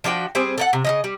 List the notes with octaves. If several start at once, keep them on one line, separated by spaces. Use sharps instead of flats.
F3 D4 F#4 G5
G3 C4 G#4 C5
A4 A#4 F#5
C3
C#3 F3 D#5
G3